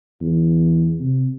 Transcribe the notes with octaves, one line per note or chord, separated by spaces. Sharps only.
E2
C3